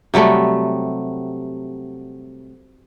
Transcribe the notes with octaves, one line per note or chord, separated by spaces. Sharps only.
C3 F#3 G3 A3